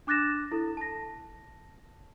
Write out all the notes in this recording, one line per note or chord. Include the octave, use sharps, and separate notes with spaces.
D4 D6 F#6 A6 A#6 E7
E4 A4
A5 A#6